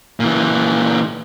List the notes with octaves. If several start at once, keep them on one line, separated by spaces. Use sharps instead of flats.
A#2 E3